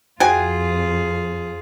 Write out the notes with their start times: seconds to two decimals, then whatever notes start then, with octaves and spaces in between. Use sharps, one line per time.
0.20 F2 F4 F#4 G#4 G5 G#5